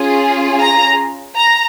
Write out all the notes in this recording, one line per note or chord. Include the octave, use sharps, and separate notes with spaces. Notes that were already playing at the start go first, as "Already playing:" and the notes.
Already playing: C#4 F4 G#4
A#5
A#5